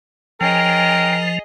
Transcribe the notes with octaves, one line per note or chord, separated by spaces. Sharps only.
F3 C#4 G#4 A#4 D#5 G5 G#5